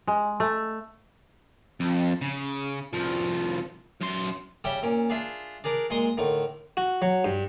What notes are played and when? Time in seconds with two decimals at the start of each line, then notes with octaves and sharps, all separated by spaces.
0.07 G#3
0.40 A3
1.80 F2
2.22 C#3
2.93 C2 F3
4.01 F#2 C6
4.64 C#3 G3 C#4 G4 E5 G5
4.83 A#2 C#4
5.10 D4 F4 G#4 E5 B5
5.64 D4 G#4 A#4 D5
5.90 A#2 G#3 C6 C#6 D#6
6.17 A2 D3 D#3
6.77 F#4
7.02 F#3
7.24 G2